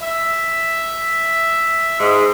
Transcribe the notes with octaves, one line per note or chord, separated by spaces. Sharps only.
E5
G#2